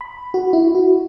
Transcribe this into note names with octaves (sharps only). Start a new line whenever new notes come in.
B5
F#4
E4
F#4